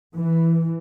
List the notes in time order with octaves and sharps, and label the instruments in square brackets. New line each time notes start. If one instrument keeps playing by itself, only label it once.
[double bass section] E3